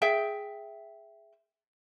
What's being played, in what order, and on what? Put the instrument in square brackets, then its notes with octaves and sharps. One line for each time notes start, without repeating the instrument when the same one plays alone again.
[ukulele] G#4 E5 G5